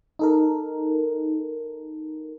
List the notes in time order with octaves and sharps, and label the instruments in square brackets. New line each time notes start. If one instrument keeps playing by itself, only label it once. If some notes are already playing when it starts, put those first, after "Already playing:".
[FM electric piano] D#4 A4 A#4